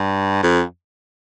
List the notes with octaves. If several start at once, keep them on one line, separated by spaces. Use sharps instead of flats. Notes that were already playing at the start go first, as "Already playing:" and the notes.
Already playing: G2
F2